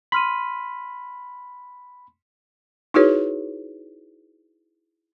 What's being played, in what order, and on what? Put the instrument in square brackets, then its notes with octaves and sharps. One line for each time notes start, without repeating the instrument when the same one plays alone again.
[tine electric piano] B5 [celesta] C6 F6 D#7
[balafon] D#4 E4 F#4 G#4 B4 C#5